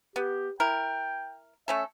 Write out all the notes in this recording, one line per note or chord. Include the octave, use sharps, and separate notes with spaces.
B3 G4
E4 A#4 G5
A3 C#4 A4 E5